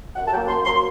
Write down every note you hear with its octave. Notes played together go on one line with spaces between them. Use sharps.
F#2 F#5
A5
F#3 A#3 G5
F#2 C6
F#3 A#3 C6